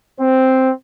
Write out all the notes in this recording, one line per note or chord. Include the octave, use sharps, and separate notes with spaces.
C4